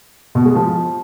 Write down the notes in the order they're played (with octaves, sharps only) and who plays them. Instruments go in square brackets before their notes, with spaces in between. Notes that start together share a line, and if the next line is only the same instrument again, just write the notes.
[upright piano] B2
G#3
F3